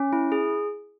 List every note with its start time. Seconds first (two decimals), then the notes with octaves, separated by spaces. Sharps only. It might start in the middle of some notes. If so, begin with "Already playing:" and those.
Already playing: C#4
0.13 E4
0.32 G#4